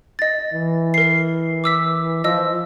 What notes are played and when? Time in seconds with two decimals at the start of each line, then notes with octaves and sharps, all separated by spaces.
0.19 D#5 A6
0.53 E3
0.94 A#4 C7
1.64 D6 E6 B6
2.24 F3 D#5 E6